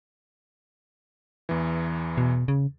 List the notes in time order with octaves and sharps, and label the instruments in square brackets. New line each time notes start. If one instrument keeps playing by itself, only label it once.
[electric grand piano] E2 E3
[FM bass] B2
C#3